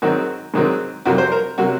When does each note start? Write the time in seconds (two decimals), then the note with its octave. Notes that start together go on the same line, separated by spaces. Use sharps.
0.02 G#2 D#3 F#3 C4 F#4
0.54 G#2 D#3 F#3 C4
1.06 F2 C3 F#3 A#3 F#4
1.18 C5
1.32 A#4
1.58 C3 F#3 A#3 F#4